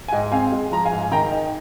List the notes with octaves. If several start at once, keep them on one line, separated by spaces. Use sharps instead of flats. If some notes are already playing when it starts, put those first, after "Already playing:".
G#5
G#2 D#5 G5
C4 F5 G#5
G#3
F3 A#5
F5 G#5
G#2
G#5
D#3 G5 A#5
D#4